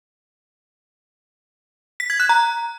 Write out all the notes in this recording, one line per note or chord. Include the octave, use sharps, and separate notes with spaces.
B6
G#6
F#6
A#5